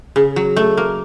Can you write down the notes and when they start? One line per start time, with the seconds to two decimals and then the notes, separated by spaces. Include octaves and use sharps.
0.16 C#3
0.36 F#3
0.56 A3
0.77 A#3